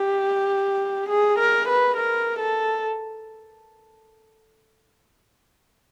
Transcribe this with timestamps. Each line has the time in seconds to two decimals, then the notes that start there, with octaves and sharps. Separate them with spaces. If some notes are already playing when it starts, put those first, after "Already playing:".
Already playing: G4
1.09 G#4
1.38 A#4
1.68 B4
1.96 A#4
2.39 A4